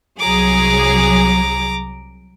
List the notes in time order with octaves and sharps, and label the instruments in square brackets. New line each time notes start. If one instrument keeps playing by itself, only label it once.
[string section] C2 F#3 G#4 [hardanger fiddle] A#5 D6